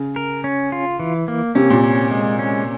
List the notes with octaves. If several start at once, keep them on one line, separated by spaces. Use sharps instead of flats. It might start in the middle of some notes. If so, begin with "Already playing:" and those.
Already playing: C#3
A#4
C#4
F4
E3
A#3
C3 C#4
A#2
C#4
G#3
C#4